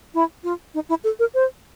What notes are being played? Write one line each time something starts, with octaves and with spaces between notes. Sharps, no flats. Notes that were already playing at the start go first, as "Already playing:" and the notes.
E4
F4
D#4
E4
A4
A#4
C5